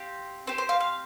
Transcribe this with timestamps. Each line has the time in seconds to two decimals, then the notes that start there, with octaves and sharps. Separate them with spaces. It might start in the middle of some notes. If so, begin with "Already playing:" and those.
Already playing: C4 G4 F5
0.47 C4 G4 C5
0.58 C5
0.69 F5
0.80 F5